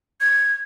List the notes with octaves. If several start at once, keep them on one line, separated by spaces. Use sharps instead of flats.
G#6